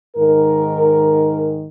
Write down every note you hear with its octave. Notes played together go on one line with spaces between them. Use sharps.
G#2 D#3 A#4